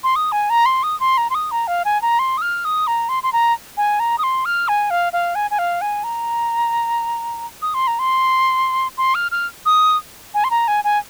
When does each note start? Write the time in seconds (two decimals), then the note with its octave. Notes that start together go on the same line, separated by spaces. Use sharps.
0.04 C6
0.16 D#6
0.32 G#5
0.50 A#5
0.66 C6
0.83 D#6
1.00 C6
1.17 A#5
1.30 C6
1.35 D#6
1.51 A#5
1.67 F5
1.85 G#5
2.02 A#5
2.19 C6
2.37 D#6
2.42 F6
2.65 D#6
2.87 A#5
3.09 C6
3.23 C6
3.33 A#5
3.77 G#5
4.00 A#5
4.18 D#6
4.23 C6
4.45 F6
4.68 G#5
4.90 F5
5.13 F5
5.35 G#5
5.51 G#5
5.59 F5
5.81 G#5
6.04 A#5
7.62 D#6
7.74 C6
7.87 A#5
7.99 C6
8.98 C6
9.15 F6
9.31 F6
9.66 D#6
10.34 G#5
10.44 C6
10.51 A#5
10.68 G#5
10.84 G#5